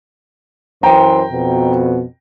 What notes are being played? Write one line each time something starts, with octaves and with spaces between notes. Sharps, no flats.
F#2 E3 C5 G5 A#5
F2 B2